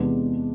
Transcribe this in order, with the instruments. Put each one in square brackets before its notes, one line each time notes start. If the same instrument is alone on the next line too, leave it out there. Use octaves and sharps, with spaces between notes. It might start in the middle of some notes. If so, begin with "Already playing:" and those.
Already playing: [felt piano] E2 C3 G#3 B3 D4